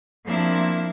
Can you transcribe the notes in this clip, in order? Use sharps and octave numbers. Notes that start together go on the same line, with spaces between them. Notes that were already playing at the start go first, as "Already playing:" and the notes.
F3 A#3 C4 D4 E4 E5